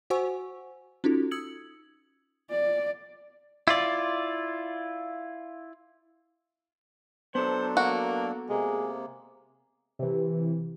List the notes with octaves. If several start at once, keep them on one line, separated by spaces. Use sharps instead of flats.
F#4 C5 F#5 G#5 C#6 E6
C#4 D#4 F4 F#4 A4
D#6 E6 G#6 C#7 F#7
D5
E4 F4 D5
F#3 B3 D4 A4 C5
A#3 F#4
C3 G#3 A#3
C3 E3